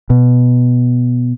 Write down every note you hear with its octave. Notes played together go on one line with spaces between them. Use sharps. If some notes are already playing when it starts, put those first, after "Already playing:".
B2